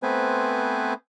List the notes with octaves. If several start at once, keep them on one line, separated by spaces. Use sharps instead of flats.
A3 B3 C4 B4 C5 G#5